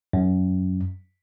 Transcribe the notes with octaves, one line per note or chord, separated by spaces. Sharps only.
F#2